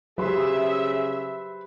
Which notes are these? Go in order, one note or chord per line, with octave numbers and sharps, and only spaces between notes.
C#3 F#3 G4 G#4 B4 C5 E5 C6